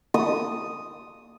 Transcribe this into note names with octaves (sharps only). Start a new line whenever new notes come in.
D#6